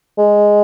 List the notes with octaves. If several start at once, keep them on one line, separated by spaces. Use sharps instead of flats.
G#3